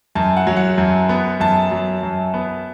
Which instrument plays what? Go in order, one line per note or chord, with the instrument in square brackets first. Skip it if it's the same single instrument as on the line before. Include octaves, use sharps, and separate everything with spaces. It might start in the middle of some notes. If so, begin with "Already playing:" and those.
[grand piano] F#2 [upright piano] A5
[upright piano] F#5
[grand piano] F#3
[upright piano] F#5
[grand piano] F#2
B3
[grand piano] F#2 [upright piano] A5
[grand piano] F#3
F#2
B3